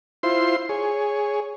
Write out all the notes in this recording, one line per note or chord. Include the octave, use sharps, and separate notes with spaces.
E4 F4 C5 C6
G#4 C#5